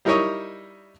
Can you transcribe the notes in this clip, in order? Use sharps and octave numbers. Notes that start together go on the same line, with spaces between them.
G3 D#4 E4 A#4 C#5 D#5